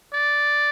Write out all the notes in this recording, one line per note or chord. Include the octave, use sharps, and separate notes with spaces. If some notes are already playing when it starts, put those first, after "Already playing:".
D5